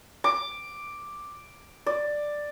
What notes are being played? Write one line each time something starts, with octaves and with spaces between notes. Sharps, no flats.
D6
D5